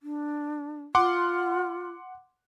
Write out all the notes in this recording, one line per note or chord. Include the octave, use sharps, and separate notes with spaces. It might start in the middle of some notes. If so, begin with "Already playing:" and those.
D4
F4 F#5 C6 D6